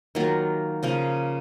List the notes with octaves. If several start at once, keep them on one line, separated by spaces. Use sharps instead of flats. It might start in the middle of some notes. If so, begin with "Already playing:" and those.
D#3 F#3 A#3 F4
C#3 F3 A#3